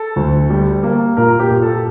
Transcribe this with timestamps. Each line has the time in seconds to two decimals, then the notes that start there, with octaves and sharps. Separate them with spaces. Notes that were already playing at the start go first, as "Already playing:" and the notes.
Already playing: A4
0.16 D2
0.50 G3
0.83 A#3
1.17 A#2 A#4
1.39 G4
1.51 A#2
1.62 A4